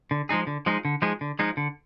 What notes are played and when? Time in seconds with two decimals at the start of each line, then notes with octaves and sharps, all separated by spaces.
0.11 D3
0.29 F3 G#3 D#4 G#4
0.47 D3
0.66 F3 G#3 D#4 G#4
0.85 D3
1.02 F3 G#3 D#4 G#4
1.21 D3
1.39 F3 G#3 D#4 G#4
1.57 D3